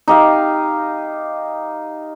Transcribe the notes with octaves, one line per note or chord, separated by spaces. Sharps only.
D#4 G4 F5